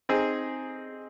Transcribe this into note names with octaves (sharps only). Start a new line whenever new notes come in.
C4 D#4 G#4